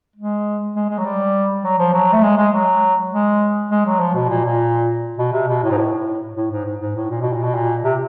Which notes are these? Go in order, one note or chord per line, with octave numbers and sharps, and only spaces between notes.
G#3
G#3
G#3
F#3
G3
F#3
F3
F#3
A3
G#3
G#3
F#3
G#3
G#3
F#3
F3
B2
A#2
A#2
B2
C3
B2
A2
G#2
A2
A2
G#2
G#2
G#2
A2
A#2
B2
A#2
B2
A#2
C3